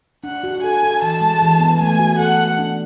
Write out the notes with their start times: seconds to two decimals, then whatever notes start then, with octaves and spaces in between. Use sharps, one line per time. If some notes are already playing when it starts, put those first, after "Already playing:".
0.24 D4 F#5
0.44 F#4
0.63 A4 G#5
0.83 A4
1.02 E3 A5
1.21 G#3
1.42 E3
1.60 B3
1.80 A3 G#5
1.99 F#4
2.19 A4 F#5
2.38 A4
2.58 D4